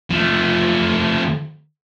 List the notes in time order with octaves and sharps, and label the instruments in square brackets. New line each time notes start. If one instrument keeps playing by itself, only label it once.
[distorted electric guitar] F3 A3